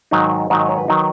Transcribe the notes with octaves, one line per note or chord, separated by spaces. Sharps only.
G#2 D#3 F#3 D#4
G#2 D#3 F#3 D#4 F#5
D#5
C#5
B4
D#3 F#3 D#4